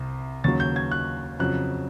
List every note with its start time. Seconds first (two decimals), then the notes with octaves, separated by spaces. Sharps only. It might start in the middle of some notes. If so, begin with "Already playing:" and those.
Already playing: C2 C3
0.44 D#2 C#3 F#3 A6
0.60 G6
0.76 G#6
0.91 F#6
1.39 F2 C#3 F#3 F#6